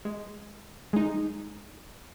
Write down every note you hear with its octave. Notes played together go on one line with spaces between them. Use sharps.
G#3
G#3 D#4